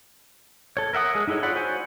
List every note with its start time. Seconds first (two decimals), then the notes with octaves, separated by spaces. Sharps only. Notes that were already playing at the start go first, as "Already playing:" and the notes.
0.77 A4 C#5
0.93 A#4 E5 F#5 D#6
1.15 G#3 G#4
1.28 D#4 E4 G#4 A4 C#5
1.43 F4 C#5 D5 F#5 B5
1.55 F#4 C5 C#5 G#5